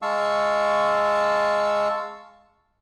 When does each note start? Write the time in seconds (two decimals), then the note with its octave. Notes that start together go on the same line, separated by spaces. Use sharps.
0.02 G#3 F5 A5 C#6 E6